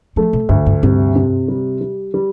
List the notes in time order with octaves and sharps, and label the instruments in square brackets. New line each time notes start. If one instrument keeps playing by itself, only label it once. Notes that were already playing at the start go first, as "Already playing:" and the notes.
[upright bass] F3 [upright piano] A3
[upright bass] C3
[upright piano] D2 [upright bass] G2
[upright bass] G2
[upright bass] G2 [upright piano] C3
[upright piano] C3
G3
G3
G3